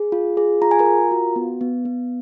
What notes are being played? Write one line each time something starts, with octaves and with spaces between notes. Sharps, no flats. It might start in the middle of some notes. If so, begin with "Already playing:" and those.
Already playing: G#4
F4
G#4
F4 A#5
G#5
A#4 A#5
F4
F#4
B3
B3
B3